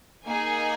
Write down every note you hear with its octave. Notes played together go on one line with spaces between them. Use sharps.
A#3 D#4 G#4 G#5